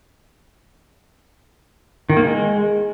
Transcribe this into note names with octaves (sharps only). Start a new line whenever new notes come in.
D#3
A#3
G#3